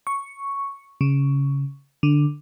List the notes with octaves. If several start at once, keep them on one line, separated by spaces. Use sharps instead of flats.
C#6
C#3
D3